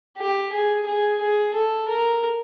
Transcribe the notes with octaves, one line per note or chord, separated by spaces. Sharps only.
G4
G#4
G#4
G#4
A4
A#4